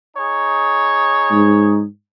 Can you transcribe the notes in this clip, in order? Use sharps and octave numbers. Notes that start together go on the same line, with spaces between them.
D#4 G#4 C#5
G#2